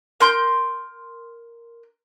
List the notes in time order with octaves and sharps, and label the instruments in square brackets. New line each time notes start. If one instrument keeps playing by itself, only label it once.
[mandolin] A#4 C6 G6